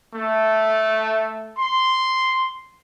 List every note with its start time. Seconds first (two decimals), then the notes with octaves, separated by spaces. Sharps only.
0.14 A3
1.56 C6